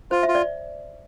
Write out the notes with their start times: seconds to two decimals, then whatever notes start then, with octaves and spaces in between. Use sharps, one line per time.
0.11 F4 C5
0.23 E5
0.28 F4
0.35 D5